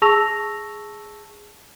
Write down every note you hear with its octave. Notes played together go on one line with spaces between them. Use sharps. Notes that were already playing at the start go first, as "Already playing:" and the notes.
G#4 A5 C#6 E6 A#6 F7